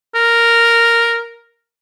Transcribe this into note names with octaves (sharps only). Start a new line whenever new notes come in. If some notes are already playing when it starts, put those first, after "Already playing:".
A#4